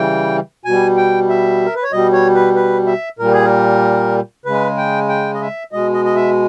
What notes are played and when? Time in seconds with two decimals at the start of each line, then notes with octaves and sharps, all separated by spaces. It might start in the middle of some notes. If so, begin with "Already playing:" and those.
Already playing: C#3 E3 G3 G5
0.65 B2 G3 G#5
0.97 G5
1.29 E5
1.66 A#4
1.75 B4
1.83 C#5
1.92 B2 G3 D#5
2.13 C#5
2.34 B4
2.56 B4
2.87 E5
3.19 A#2 G3 A#4
3.33 G#4
3.45 A#4
4.46 C#3 G#3 B4
4.77 G5
5.09 G5
5.34 D#5
5.41 E5
5.72 B2 G#3 D#5
5.94 D#5
6.05 D#5
6.15 E5